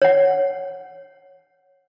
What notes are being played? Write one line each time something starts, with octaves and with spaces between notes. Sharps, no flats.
C#5 F#5